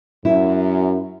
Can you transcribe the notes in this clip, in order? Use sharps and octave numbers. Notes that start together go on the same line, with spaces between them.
F#2 E4